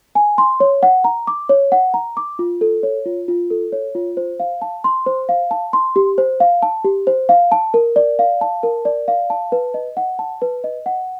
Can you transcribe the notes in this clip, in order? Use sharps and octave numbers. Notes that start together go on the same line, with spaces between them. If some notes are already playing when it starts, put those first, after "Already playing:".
G#5
C6
C#5
F#5
A#5
D6
C#5
F#5
A#5
D6
F4
A4
C#5
F4
F4
A4
C#5
F4
C5
F5
A5
C6
C5
F5
A5
C6
G4
C5
F5
A5
G4
C5
F5
A5
A#4
D5
F5
A5
A#4
D5
F5
A5
B4
D#5
F#5
A5
B4
D#5
F#5